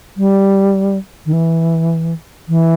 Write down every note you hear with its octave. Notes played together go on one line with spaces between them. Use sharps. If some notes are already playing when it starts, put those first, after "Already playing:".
G3
D#3
E3
E3